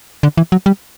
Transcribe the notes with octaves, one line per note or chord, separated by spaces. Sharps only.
D3
E3
F#3
G3